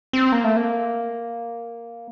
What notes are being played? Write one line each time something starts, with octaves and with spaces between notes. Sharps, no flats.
C4
A#3
A3
A#3